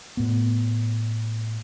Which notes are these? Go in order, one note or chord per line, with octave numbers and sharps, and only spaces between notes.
A2 B3